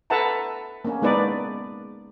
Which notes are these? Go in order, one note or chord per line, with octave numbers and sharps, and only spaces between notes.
A4 B4 E5 F#5 A5 A#5
A#3 C#4
G#3 B3 D#4 B4 D5